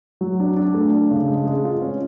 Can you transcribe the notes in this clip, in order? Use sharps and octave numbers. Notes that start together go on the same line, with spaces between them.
F#3
D4
D4
A3
D4
C#3
G#3
G#3
F4
C#4